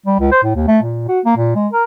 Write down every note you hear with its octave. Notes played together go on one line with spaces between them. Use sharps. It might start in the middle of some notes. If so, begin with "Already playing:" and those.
G3
C#2
C5
A2
D#2
A3
A#2
F#4
A#3
A#2
G#3
A#4